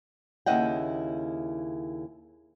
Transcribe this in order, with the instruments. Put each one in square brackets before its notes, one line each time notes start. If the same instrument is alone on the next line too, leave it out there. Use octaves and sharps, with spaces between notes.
[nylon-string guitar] D#2 C#3 E4 D#5 F#5 G5